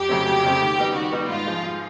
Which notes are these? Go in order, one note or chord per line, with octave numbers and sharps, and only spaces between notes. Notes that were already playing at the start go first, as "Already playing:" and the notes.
Already playing: F2 G4
C#3 F#3 A3 C4
F2
C#3 F#3 A3 C4
D#3
G3 B3 D#4
D#3 F#4
G3 B3 D#4
G#2 F4
F3 G#3
G#2